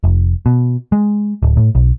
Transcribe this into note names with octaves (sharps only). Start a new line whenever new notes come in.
F1
B2
G#3
D1
A2
B1